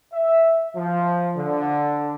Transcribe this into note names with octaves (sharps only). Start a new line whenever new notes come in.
E5
F3
D3